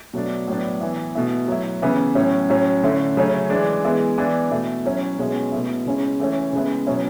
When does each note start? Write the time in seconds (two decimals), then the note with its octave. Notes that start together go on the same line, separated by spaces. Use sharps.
0.13 B2 F#3 A3 D4
0.48 A2 F#3 B3 D4
0.81 E3 B3 E4
1.15 B2 A3 E4
1.48 F#3 A3 E4
1.82 C#3 E3 B3 E4
2.15 A2 F#3 C#4 E4
2.50 A2 F#3 C#4
2.83 D3 A3 C#4 E4
3.17 C#3 F#3 A3 C#4
3.50 E3 G#3 D4
3.84 E3 G#3 B3 E4
4.18 E3 B3 D4
4.51 B2 A3 E4
4.85 F#3 C#4 E4
5.18 B2 G#3 C#4 E4
5.52 B2 A3 E4
5.86 C#3 G#3 C#4 E4
6.20 E3 A3 C#4 E4
6.53 C#3 G#3 B3 E4
6.87 B2 F#3 C#4 E4